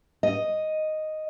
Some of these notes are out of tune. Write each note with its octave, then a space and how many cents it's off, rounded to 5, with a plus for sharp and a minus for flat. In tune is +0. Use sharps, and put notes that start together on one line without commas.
D#5 +0